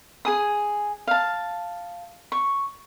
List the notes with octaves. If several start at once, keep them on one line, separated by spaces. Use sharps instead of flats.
G#4 G#5 D#6
F5 A5
C#6